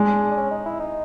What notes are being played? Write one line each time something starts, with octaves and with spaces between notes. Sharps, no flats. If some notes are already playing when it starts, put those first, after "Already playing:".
Already playing: G#3 D4
D4
C#4
D#4
E4
D#4